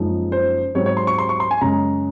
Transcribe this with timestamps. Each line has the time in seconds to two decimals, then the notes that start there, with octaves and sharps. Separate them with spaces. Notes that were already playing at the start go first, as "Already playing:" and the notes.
Already playing: F#1 F#2 F3 G#3 D#4
0.32 C5
0.75 G#2 F#3 C4 C#5
0.86 C#5
0.97 C6
1.07 C#6
1.18 C6
1.29 C#6
1.40 C6
1.51 G#5
1.61 F#2 C#3 G#3 C#4 A#5